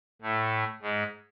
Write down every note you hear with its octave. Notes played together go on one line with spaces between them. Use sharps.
A2 A3
G#2 G#3